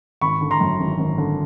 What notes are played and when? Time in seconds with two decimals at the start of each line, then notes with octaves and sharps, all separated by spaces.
0.21 G#1 B5 C#6
0.41 D3
0.51 A#5 C6
0.61 F#2
0.80 G#1
0.99 G#1
1.18 D3